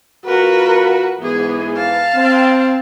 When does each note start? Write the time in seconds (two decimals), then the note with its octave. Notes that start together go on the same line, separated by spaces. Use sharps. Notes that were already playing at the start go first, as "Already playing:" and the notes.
0.25 F2 F4 F#4 A#4 B4
1.20 G#2 E3 B3 G#4
1.76 F5 A5
2.15 C4